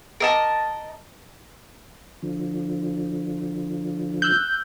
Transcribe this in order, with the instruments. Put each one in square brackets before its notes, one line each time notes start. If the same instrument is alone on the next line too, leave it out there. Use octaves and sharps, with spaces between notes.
[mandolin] A#4 D#5 A5
[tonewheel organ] D3 F3
[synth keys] E6 F#6 G6